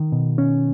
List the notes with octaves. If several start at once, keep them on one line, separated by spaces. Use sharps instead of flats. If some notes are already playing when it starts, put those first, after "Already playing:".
Already playing: D#3
B2
C#4